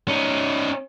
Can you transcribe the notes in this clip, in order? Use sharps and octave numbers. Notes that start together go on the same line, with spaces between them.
C#4 D#4